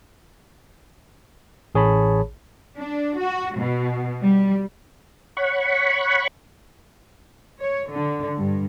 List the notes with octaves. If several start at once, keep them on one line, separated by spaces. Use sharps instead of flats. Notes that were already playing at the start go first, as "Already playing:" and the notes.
A1 G#4 C#5 A5 B5
D4
F#4
B2
G3
C#5 F#5 B5 C#6
C#5
D3
G2